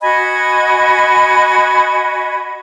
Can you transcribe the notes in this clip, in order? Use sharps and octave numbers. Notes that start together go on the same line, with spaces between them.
F#4 D#5 G#5 B5